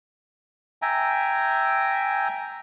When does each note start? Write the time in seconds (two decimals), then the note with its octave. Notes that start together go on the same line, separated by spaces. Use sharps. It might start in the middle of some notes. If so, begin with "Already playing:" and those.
0.82 E5 G5 G#5 A#5